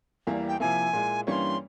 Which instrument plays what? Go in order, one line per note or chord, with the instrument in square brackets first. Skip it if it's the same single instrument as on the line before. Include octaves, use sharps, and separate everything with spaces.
[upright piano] E2 E3 G3 A#3 E4
[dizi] G5
[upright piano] C3 F3 A#3 E4 [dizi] G#5
[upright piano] A#2 G#3 E4
[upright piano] G2 E3 G3 A#3 C#4 [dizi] C6 C#6